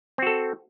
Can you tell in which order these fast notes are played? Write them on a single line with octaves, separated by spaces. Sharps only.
C4 F#4 A4